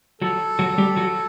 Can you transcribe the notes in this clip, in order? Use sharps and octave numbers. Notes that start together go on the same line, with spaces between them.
F#3 F#4 A4
F#3 F#4
G3 G4
F#3 F#4